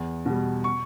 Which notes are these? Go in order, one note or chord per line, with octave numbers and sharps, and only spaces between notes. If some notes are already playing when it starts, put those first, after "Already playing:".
Already playing: E2
B2 G3
C#6